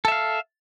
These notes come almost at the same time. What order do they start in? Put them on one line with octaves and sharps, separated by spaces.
A4 E5 F5